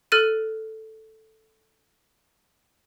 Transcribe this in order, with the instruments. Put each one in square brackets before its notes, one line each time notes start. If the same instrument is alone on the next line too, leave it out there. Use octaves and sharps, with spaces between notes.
[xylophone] A4 F6 F#6 A6 D#7